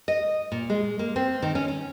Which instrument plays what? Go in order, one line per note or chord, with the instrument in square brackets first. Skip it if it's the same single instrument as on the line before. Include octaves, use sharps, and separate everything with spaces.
[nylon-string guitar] D#5
A#2
G#3
A#3
C4
D#3
C#4
C#4